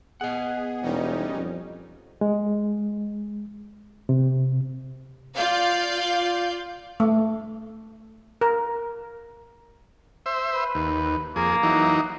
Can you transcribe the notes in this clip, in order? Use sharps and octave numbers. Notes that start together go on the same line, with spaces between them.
B3 G#4 D#5 F#5
E1 G3 C#4 D#4
F2
G#3
C3
F4 D5 F5 G6
A3
A#4
C5 E5
B4
D#2
F2 A#3 G#4
E3 F#3 D#4